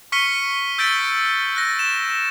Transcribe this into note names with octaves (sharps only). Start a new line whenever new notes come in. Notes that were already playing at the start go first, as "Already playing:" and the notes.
C#6 F6 B6 C#7 D#7 G7
E6 G6 A6 B6 D7 G7
F#6 A#6
E7